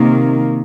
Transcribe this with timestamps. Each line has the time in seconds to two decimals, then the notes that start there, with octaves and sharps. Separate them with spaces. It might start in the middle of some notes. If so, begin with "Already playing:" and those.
Already playing: C3 D#3 A#3